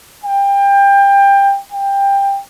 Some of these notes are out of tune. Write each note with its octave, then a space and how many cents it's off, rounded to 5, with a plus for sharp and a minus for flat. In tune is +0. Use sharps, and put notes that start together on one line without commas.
G5 +25
G5 +20